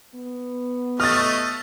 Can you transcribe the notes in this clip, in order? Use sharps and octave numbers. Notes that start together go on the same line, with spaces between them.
B3
A3 C#5 D#5 F6 A6